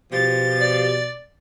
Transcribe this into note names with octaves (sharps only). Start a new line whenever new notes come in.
B2 F3 G4 A6
D5